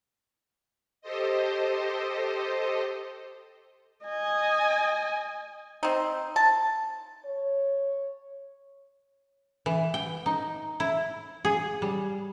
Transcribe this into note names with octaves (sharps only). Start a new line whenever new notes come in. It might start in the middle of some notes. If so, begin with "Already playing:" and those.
G4 A4 C5 D#5
D#5 G#5
C4 D#4
A5
C#5
E3
G5
D#4
E4
G#4
G3